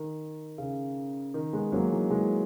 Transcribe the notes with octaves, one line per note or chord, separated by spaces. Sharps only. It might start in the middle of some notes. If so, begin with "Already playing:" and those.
Already playing: D#3
C#3
D#3
G#3 B3
F#3 A#3
E3 G#3
E3 G#3